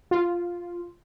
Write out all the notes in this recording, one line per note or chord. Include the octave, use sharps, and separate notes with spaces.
F4